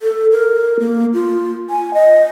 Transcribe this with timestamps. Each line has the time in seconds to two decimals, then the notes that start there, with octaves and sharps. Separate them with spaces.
0.02 A4
0.32 A#4
0.80 A#3
1.14 F4
1.70 G#5
1.94 D#5